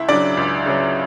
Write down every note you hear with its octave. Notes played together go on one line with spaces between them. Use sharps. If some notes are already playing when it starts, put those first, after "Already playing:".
Already playing: C#2 E4 E5
C#3 F#3 D4 D5
C#2
C#3 F#3